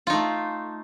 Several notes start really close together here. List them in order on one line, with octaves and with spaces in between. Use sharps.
F4 D#4 A3